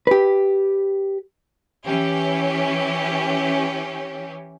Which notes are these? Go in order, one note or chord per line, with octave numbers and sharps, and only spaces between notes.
G4 B4
E3 C#4 G4